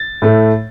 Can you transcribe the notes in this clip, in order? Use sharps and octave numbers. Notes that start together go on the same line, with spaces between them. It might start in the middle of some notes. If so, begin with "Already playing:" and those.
Already playing: A6
A2 A3